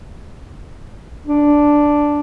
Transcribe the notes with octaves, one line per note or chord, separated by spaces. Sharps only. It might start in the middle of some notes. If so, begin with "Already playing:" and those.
D4